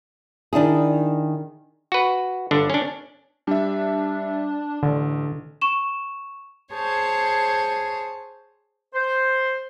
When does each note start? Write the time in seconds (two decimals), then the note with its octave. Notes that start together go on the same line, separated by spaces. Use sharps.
0.53 D#3 D4 E4 G#4
1.92 F#4 B4
2.51 G1 D3 D4
2.70 C#4 D4
3.47 G3 D4 E5
4.83 A1 D3
5.61 C#6 E7
6.73 G#4 C5 C#5 A5
8.94 C5